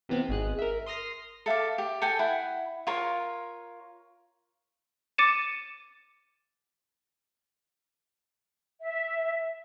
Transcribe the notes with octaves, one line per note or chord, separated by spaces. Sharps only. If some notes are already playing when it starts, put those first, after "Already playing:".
C3 E3 B3 C4
G#1 G#2 G#4 F#6
A#4 E5
C6 D#6 F6 A#6 C7
A4 E5 F5 D6
G4
A4 G5 G#5
E4 F#5
F4 A#4 C#5
D6 A6 C#7 D#7 E7
E5